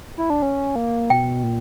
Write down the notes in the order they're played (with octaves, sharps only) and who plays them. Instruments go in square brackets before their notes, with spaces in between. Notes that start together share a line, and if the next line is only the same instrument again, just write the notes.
[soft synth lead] E4
D4
C#4
A#3
[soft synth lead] B2 [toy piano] G5
[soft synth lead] A#2